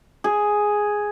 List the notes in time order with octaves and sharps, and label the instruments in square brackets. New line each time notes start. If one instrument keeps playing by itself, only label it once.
[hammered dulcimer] G#4